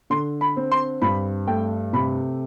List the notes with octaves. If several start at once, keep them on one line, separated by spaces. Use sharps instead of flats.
D3 C6
B5
C4
C6
G2 B5
A3 G5
C3 B5